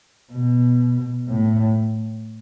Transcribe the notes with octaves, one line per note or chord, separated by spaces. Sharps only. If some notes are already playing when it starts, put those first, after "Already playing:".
B2
A2